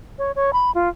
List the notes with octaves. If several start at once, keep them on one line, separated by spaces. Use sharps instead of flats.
C#5
C#5
B5
F4